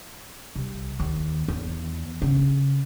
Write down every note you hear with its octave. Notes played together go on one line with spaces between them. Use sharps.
C2
D#2
E2
C#3